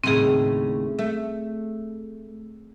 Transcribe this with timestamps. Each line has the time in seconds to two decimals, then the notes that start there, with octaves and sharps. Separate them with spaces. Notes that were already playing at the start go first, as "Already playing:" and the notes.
0.04 D#2 A2 C#3 C4 G#4
0.99 A3